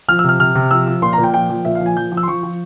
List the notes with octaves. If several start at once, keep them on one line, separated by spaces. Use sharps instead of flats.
F3 F6
E6
C3 F6
C3 F6
C3
F3 E6
F3
A#2 C6
A#5
A#2
G5
F3 G5
F3
A#2 E5
F5
F3
G#5
F3 G6
F3
E6
C6
F3 C#6
F3